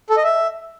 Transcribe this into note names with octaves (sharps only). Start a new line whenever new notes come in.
A4
D#5
E5